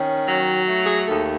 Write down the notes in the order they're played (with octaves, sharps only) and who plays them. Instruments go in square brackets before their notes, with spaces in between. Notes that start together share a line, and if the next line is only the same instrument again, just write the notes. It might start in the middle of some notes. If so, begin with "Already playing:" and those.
Already playing: [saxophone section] D#3 C#4
F#3
A3
G#4
D#2 A4